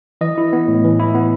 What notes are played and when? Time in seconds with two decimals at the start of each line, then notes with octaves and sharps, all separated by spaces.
0.21 E3 D#5
0.38 E4
0.53 B3
0.68 A2
0.84 E3
1.00 E4
1.15 B3